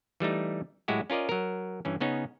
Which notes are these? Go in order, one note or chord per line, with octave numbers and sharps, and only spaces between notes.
E3 G3 A3 D#4
A2 F#3 G#3 E4 F#4 G4
C#4 F4 A#4 D5 D#5
F#3 A#4
G2 E3 C#4
C#3 B3 C#4 D#4